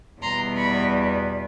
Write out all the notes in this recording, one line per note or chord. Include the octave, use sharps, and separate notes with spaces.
E2 B2 G3 B3 A#5 C6
B5 C#6